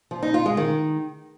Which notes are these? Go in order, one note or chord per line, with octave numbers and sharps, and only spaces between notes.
F3
D#4
F4
G#3
D#3